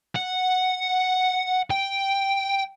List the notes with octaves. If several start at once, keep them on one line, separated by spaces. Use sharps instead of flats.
F#5
G5